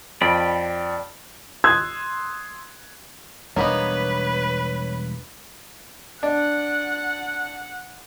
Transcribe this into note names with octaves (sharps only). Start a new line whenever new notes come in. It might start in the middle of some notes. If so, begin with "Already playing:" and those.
F2 D5 G5 B5
C6 D#6 E6 F#6 G#6
E1 G3 A#3 B3 D4 D#4 B4 C#5
D4 F#5 F#6